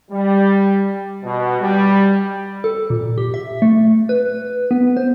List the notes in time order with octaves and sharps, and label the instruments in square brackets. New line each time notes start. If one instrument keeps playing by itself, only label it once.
[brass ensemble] G3
B2
G3
[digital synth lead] A4
A#2
G4
E5
A3
B4
B3
C5